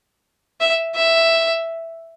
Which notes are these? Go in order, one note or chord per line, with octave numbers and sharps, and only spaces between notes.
E5
E5